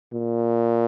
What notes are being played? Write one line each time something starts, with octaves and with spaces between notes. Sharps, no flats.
A#2